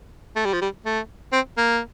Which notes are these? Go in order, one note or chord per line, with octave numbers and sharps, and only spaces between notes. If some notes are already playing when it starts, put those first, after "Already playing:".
A3
G3
F3
G3
A3
C4
A#3